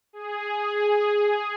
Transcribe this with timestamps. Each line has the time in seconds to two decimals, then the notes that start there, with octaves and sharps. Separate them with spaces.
0.13 G#4